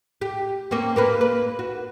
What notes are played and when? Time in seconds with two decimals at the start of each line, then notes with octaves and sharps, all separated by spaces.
0.21 G4
0.71 A#3 C4 C#4
0.96 A#3 A#4 B4
1.21 B4
1.59 F#4